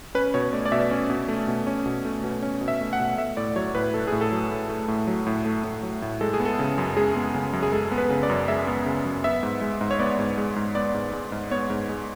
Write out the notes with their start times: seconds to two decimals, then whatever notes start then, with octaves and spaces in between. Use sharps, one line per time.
0.15 C#4 B4
0.34 B2 C#5
0.53 A3 D5
0.66 D5
0.72 B2 E5
0.91 C#4
1.10 B2
1.28 A3
1.48 B2
1.67 C#4
1.86 B2
2.05 A3
2.24 B2
2.43 C#4
2.61 B2
2.68 E5
2.81 A3
2.93 F#5
2.99 B2
3.18 A3 E5
3.37 A2 D5
3.56 F#3 C#5
3.75 A2 B4
3.94 A3 A4
4.07 A2 G#4
4.21 A4
4.32 F#3
4.51 A2
4.69 A3
4.88 A2
5.07 F#3
5.27 A2
5.45 A3
5.64 A2
5.83 F#3
6.02 A2
6.21 G#3 A4
6.34 G#4
6.40 B3
6.45 A4
6.59 C#3
6.78 F#2
6.97 G#3 G#4
7.16 B3
7.34 C#3
7.53 F#2
7.63 G#4
7.72 G#3 A4
7.91 B3
7.98 B4
8.10 C#3
8.23 D5
8.30 F#2
8.48 G#3 E5
8.67 B3
8.86 C#3
9.05 F#2
9.24 B3 E5
9.43 G#2
9.61 G#3
9.81 G#2
9.91 C#5
9.99 B3 D5
10.19 G#2
10.38 G#3
10.56 G#2
10.75 B3 D5
10.94 G#2
11.13 G#3
11.32 G#2
11.51 B3 C#5
11.70 G#2
11.89 G#3